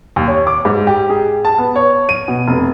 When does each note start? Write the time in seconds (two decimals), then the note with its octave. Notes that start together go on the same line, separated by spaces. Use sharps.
0.16 D#2
0.28 C#5
0.47 D6
0.65 G#2
0.87 G4
1.10 G#4
1.45 A5
1.58 B3
1.76 C#5
2.09 D#7
2.28 B2
2.48 F1